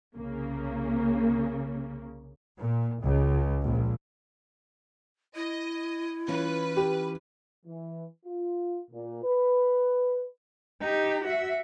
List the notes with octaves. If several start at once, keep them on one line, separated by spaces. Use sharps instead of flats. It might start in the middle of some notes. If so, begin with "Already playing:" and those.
C2 C#3 A#3
A#2
C#2
A#1
E4 D#5
E3 C#4 F4 B4
G4
E3
F4
A#2
B4
D#4 G4
F#4 E5